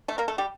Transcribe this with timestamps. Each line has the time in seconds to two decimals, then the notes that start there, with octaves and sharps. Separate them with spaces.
0.08 A3 A4
0.18 A#3 A#4
0.28 A3 A4
0.38 G3 G4